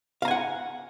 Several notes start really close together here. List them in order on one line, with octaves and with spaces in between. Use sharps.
F5 A#5 G#5 F#5